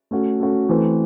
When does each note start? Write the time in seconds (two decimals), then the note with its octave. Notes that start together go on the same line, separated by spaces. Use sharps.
0.11 A3 C#4 F#4
0.40 A3 C#4 F#4
0.69 E3 A3 C4